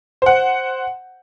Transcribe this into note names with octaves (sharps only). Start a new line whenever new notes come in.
C5 F#5